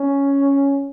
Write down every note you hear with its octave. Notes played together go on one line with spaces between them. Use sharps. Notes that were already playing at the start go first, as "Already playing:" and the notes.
Already playing: C#4